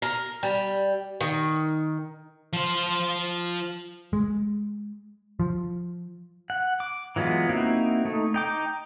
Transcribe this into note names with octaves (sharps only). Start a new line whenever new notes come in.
A#4
G3
D#3
F3 C5
G#3
F3
F#5
D6
E3 F#3 G#3 B3 F4
A#3 C4 D#4 E4 F#4
A3 D#4
D#4 G5 D6